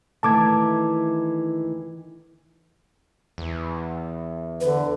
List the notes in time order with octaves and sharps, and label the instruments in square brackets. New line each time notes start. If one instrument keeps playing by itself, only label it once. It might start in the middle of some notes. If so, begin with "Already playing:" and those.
[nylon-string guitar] D#3 E3 A3 [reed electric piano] A5 D6 G#6
[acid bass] E2
[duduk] D3 [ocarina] B4